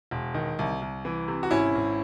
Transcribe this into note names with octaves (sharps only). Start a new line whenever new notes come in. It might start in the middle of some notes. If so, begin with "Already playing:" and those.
E1
D#3
C2
C2
E3
C3
F#4
G#1 C#4 E4
G#1